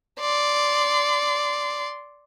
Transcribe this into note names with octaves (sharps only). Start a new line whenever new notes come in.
D5 C6